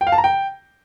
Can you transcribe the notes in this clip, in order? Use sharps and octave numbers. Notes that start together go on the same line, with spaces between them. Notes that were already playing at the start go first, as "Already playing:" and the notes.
G5
F5
A5
A#5
G5